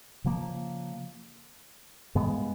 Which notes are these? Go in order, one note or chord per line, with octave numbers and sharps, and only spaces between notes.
C#3 F3 A#3
G2 E3 G#3 B3